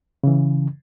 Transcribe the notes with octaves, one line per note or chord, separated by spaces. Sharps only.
C#3 E3